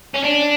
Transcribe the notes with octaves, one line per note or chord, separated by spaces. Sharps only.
C#4
D4